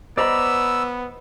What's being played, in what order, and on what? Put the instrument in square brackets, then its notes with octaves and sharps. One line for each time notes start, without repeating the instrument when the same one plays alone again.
[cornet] B3 [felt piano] C5 D#5 [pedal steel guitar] D5 A#5 B5 [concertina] E6